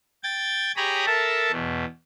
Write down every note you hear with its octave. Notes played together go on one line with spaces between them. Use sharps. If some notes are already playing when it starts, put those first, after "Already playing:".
G5 G#6 A6
G4 G#4 C#5 A#5 B5 D#6
A4 A#4 E5 A5
E2 B2